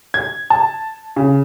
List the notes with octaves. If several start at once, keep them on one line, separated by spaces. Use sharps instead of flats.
G#6
A5
C#3